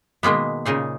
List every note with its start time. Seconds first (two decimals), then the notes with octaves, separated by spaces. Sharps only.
0.23 B2 D#3 G#3 A#3 B3
0.65 A#2 C#3 D#4 G#4